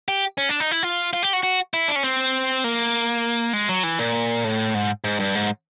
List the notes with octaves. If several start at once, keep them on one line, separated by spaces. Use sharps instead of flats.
G4
C#4
D4
D#4
E4
F4
F4
G4
F#4
F#4
E4
D4
C#4
C4
A#3
G#3
F#3
E3
A#2
A2
G#2
G#2
G2
G#2